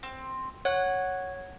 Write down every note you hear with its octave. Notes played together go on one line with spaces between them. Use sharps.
C4
C#5 F#5